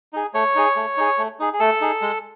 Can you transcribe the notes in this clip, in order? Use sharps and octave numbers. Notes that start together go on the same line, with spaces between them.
D#4 G#4
A3 C#5
D#4 G#4
A3
D#4 G#4
A3
D#4 G#4
G#4
A3 A4
D#4 G#4
G#3